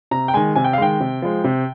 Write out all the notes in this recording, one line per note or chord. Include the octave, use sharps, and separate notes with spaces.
C3 A#5
G5
D#3 G#3 G#5
C3 G#5
G5
F5
D#3 G#3 G5
C3
F3 G#3
C3